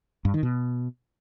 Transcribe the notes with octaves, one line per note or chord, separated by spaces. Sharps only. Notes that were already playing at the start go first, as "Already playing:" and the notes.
G2
D#3
B2